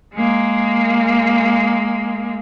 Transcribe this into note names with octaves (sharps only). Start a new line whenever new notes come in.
G#3 A#3